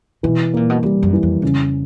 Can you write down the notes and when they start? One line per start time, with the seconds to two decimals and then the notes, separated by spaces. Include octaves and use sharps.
0.23 B2 E3
0.54 A#2 A#3
0.70 B2
0.83 C3 G3
1.03 F#2
1.13 E3
1.23 F2
1.42 F2 C#3